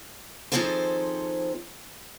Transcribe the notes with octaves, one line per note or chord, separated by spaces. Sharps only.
D#3 F3 C4 G#4 A4 C5